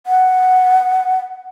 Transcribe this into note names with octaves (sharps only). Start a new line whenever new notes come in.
F#5